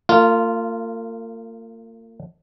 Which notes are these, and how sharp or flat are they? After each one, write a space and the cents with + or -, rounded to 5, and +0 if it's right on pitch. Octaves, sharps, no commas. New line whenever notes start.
A#3 -40 F4 -10